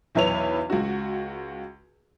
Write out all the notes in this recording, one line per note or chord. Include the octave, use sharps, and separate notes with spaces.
B1 E2 E4 B4 C#5 F7
C#2 F#4